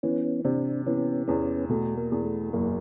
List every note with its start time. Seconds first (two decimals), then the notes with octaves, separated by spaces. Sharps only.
0.03 E3 B3 C#4
0.45 C3 C4 D4
0.86 E3 B3 C#4
1.28 E2 B3 C#4
1.70 B2 A3
1.97 A#3
2.12 E2
2.25 A3
2.53 F#1 A#3